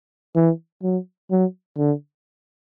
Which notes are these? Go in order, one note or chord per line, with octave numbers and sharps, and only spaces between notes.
E3
F#3
F#3
D3